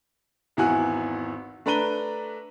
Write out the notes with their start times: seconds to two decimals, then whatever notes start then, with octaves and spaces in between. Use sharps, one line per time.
0.57 G#1 E2 E4 F#4 G#5 F#6
1.66 A3 D4 B4 A#5 D#7 G7